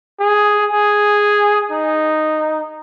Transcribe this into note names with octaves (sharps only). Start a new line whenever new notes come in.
G#4
G#4
D#4